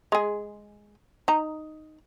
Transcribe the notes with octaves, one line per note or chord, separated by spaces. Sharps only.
G#3 G#4
D#4 A#5